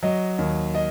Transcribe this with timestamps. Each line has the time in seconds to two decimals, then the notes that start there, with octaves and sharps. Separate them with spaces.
0.03 F#3 D#5
0.38 D#2
0.74 D#5